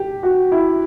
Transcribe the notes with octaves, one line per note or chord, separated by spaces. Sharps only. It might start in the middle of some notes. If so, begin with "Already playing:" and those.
Already playing: G4
F#4
E4